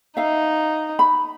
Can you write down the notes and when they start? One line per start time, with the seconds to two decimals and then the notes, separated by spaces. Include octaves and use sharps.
0.17 D#4 E5 F5
0.99 B5